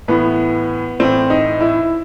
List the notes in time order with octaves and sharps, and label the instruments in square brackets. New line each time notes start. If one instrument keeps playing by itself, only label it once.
[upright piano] A2 E3 B3
A2 E3 C4
D#4
E4